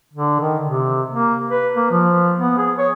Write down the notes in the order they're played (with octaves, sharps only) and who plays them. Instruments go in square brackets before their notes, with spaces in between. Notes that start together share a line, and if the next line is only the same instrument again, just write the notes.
[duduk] D3
D#3
C3
A#3
B4
A#3
F3
B3
G#4
C#5